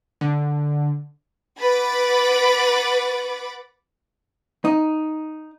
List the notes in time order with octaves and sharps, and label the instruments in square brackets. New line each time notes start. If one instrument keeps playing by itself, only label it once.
[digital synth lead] D3
[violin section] B4 F#5 B5 D6 A6
[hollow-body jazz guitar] D#4